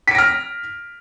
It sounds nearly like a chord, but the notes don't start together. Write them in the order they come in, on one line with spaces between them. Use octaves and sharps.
B6 D7 A#6 F6